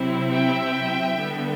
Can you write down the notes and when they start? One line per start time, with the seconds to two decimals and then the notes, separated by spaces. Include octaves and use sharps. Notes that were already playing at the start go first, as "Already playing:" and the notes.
Already playing: C3 F#3 C4 E4
0.32 E5 G5
1.18 D3 G3 B3